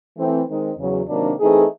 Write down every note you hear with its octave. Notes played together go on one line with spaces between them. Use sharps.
E3 A3 C4
D#3 G#3 C4 D#4
E2 C#3 F#3
C3 D#3 F#3 A#3 D4
E3 A3 C4 D#4 G#4